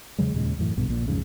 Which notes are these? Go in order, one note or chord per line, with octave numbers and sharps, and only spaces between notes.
E2 C#3 F#3 G#3
D#2 A#2 C#3 G#3
F#2 A2 E3
A#1 G2 B2 D3
A#1 A#2
B1 F2 G#2 C#3